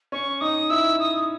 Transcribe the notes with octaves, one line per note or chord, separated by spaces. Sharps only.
C#4 C#6
D#4 D#6
E4 E6
D#6